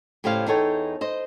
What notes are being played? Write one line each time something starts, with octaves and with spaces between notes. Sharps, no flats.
A2 C#3 G4 C5 D5 F5
E2 D#4 A4 C#5 G5
C5 D#5